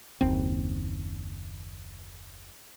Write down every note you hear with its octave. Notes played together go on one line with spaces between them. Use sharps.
F#1 D#2 C4